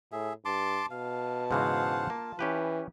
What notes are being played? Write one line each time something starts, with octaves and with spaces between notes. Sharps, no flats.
A2 G#4 E5
G2 A5 C6 D6
B2 F5 A5
G#2 C#3 E3 C5 F5 F#5
A#3 F4
E3 C#4 G4 B4